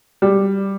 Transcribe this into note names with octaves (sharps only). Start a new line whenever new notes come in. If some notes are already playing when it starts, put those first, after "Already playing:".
G3